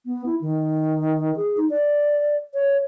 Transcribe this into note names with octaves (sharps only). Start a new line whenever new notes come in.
B3
E4
D#3
G#4
D#4
D5
C#5